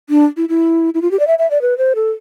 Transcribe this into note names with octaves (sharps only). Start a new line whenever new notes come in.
D4
E4
E4
E4
F4
G4
D5
E5
E5
D5
B4
C5
A4